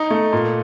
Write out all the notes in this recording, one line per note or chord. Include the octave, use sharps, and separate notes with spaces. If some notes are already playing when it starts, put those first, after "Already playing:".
Already playing: D#4
A3
A#2